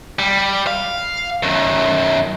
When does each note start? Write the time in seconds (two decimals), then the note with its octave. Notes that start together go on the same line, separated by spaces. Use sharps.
0.19 G3
0.67 F5
1.43 F#2 D#3